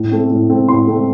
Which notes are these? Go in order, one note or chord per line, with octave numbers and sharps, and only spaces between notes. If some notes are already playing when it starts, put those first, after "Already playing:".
Already playing: A2
A3 C4
A2
A3 C4
A2 C6
A3 C4